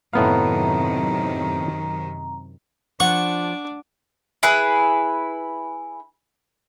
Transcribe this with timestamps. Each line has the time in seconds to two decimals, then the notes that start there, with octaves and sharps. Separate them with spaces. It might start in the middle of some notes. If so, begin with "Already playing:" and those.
0.13 F#2 A2 C3 D#3 B3 F5 A#5
3.00 F3 D4 F#5 C#6 D6
4.43 E4 G#4 B4